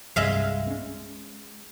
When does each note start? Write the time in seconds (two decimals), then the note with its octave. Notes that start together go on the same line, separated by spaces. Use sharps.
0.16 C2 G2 G#3 E5 F5
0.67 C4 C#4